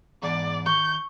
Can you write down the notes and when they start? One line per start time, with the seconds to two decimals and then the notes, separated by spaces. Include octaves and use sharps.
0.22 E2 G#2 D4 D5
0.66 D#3 C#6 G6